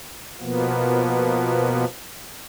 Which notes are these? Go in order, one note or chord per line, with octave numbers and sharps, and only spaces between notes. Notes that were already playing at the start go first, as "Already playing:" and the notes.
B2 F3 A#3 B3